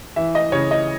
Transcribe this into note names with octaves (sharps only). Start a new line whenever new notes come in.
E3 E5
D#5
C#3 C#5
D#5